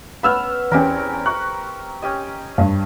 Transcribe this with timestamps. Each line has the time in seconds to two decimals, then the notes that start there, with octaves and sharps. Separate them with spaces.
0.23 B3 C#4 B5 E6 F6
0.71 E2 C4 C#4 G4 A#4
1.26 A#5 C#6 F#6
2.02 C#4 G4 D#5
2.58 G2